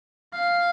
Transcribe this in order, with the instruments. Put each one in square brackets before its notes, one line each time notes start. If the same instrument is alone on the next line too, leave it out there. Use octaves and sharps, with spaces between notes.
[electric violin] F5